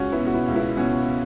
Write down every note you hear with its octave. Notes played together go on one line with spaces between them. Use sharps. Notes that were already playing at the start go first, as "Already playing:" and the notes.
Already playing: C#2 C#4 F#4
B3 E4
B2
F#4
B3 E4
C#2
B3 E4
B2 C#4 F#4